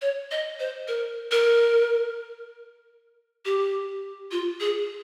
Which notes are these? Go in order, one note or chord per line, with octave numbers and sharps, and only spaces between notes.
C#5
D#5
C5
A#4
A#4
G4
F4
G#4